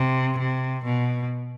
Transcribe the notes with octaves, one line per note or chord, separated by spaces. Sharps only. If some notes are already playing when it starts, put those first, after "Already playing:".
Already playing: C3
C3
B2